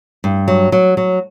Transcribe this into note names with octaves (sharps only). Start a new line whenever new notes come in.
G2
F#3
F#3
F#3